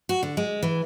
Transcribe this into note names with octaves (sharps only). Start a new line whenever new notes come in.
F#4
D3
G#3
E3